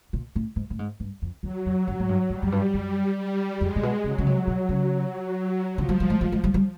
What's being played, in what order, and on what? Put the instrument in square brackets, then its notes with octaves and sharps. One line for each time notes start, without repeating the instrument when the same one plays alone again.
[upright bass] A#2
A2
G#2
A2
G#2
G2
F2
[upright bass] E2 [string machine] F#3
[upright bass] F2
F#2
G#2
G2
[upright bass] G2 [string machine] G3
[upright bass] F#2
G2
F#2
[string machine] G3
[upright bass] F2 [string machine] G#3
[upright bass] A#2
B2
[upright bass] C#3 [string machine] F#3
[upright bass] C#3
C3
B2
C#3
[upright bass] D3 [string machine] F3
[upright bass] F#3
G3
G#3
G#3
G#3
G3
G3